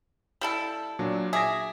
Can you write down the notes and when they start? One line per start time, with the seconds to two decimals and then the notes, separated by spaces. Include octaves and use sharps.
0.41 G3 E4 A4
0.99 A#2 F#3 D4
1.33 G#4 E5 D6 A#6